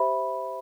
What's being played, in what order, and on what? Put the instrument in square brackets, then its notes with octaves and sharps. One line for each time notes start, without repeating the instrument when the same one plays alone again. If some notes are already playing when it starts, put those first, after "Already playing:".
Already playing: [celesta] G4 C5 E5 B5